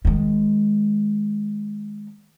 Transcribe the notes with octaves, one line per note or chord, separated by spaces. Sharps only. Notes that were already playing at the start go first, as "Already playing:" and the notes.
D#3 G#3